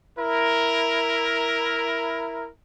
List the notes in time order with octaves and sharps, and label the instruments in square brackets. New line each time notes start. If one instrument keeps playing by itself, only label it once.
[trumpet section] E4 A#4